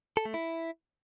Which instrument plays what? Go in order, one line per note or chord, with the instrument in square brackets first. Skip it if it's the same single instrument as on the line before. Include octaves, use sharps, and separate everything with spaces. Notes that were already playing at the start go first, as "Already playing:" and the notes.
[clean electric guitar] A4
A3
E4